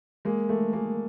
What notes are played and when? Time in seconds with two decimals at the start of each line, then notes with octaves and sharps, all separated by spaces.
0.25 G#3 A#3
0.49 A3 A#3
0.73 G#3 A#3